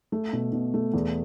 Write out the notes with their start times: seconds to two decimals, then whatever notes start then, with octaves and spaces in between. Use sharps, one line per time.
0.12 A3
0.33 B2
0.53 B2
0.74 A3
0.94 E2